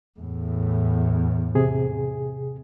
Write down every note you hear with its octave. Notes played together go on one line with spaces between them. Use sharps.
E2 A2
C3 G#4